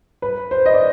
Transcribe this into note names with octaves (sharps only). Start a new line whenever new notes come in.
B4
C5
D#5
D5